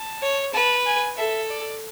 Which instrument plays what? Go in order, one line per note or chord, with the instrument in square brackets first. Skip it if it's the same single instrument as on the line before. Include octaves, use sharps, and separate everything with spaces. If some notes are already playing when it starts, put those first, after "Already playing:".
Already playing: [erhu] A5
[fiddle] C#5
[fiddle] B4 [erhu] A5
[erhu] G#5
[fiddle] A4 [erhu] E5
[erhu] D5